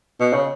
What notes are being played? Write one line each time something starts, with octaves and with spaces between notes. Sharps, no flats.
B2
C#3